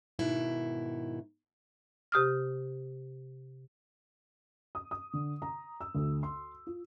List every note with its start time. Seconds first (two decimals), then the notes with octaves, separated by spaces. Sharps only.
0.19 G#2 B2 D#3 E4
2.12 C3 G4 D#6 F6
4.75 D#6
4.91 D#6
5.13 D3
5.42 A#5
5.81 E6
5.95 D2
6.23 C6
6.67 F4